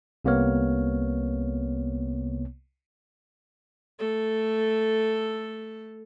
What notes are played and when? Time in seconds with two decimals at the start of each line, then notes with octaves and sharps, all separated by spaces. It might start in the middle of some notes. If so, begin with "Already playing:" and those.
0.25 C2 C3 A#3 B3 C#5 F6
3.99 A3 A4